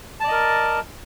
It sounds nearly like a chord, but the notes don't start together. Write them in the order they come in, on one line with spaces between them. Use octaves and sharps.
A5 D5 D#5 A#4